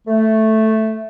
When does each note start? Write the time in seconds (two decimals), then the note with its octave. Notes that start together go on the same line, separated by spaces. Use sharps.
0.08 A3